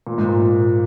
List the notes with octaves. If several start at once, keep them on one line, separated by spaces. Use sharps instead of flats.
A#2
G#2
A#2